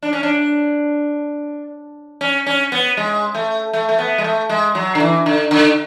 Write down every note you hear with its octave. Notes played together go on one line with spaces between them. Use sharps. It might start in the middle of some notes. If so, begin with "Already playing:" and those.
D4
C#4
D4
C#4
C#4
B3
G#3
A3
A3
A3
B3
G#3
A3
G#3
F#3
D3
E3
D3
D3